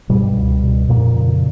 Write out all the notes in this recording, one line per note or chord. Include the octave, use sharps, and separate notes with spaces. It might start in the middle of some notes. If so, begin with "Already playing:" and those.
G2 B2 G3
C#2
B2
F2 A#2 A#3
C#3